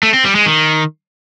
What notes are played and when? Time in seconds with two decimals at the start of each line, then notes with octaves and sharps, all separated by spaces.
0.03 A3
0.14 C4
0.24 G3
0.35 G#3
0.46 D#3